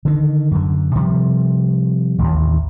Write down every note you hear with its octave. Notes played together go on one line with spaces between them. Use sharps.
D3 D#3
F#2 D3
C3 F3 G3
A1 D#2